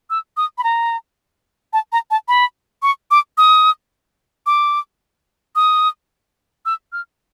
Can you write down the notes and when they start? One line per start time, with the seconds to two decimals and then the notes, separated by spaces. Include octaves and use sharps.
0.10 E6
0.37 D#6
0.58 B5
0.64 A#5
1.73 A5
1.92 A#5
2.11 A5
2.28 B5
2.82 C#6
3.11 D6
3.38 D#6
4.46 D6
5.56 D#6
6.65 E6
6.92 F6